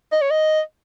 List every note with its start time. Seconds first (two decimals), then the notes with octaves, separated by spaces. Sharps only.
0.12 D#5
0.21 C#5
0.31 D#5